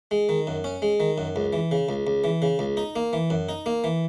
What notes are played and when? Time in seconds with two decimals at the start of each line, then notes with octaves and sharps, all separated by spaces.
0.11 G#3
0.29 D#3
0.47 F#2
0.64 C#4
0.82 G#3
1.00 D#3
1.18 F#2
1.36 C#2
1.53 E3
1.71 C#3
1.89 C#2
2.07 C#2
2.24 E3
2.42 C#3
2.59 C#2
2.77 D#4
2.96 A#3
3.13 E3
3.30 F#2
3.49 D#4
3.66 A#3
3.84 E3